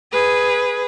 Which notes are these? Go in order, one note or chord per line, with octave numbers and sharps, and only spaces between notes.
G#4 B4